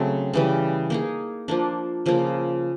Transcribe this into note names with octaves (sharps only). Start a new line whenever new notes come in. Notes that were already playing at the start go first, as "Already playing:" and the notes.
Already playing: C#3 F#3 A3 C4
C#3 E3 G3
A#3 D#4 G#4
F3 A#3 D4
C#3 F3 A#3